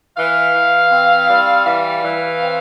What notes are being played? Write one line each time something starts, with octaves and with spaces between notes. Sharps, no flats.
E3 F5
E3
C4
G3
E3 F5
E3
C4